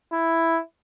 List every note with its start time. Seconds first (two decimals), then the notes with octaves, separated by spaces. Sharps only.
0.13 E4